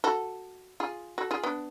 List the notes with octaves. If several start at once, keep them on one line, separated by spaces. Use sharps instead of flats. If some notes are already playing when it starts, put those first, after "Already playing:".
F#4 A4
F4 G#4
F#4 A4
F4 G#4
B3 D4